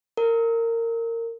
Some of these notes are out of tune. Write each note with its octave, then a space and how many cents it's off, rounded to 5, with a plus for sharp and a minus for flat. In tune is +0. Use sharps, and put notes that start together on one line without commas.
A#4 -20